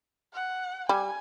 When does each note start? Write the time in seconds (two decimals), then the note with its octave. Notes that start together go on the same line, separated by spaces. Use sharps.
0.33 F#5
0.89 G3 G#5